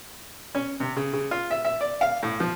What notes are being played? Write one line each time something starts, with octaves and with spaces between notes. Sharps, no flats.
C#4
C3
C#3
C#3
F4
E5
E5
D5
F5
A2
F3